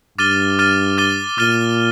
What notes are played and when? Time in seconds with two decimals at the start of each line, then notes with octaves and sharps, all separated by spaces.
0.18 G2 D6 F6 A6 D#7 G7
0.59 D6 F6 A6 D#7 G7
0.98 D6 F6 A6 D#7 G7
1.38 A#2 D6 F6 A6 D#7 G7